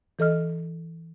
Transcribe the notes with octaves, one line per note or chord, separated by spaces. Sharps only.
E3 A4 D#5 F6